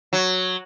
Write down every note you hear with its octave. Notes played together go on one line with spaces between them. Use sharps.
F#3